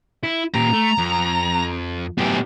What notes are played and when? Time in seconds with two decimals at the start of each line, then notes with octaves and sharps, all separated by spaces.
0.24 E4
0.54 A#2 G4 A#5
0.73 A3
0.98 F2
2.18 F#2 A2 B3 G4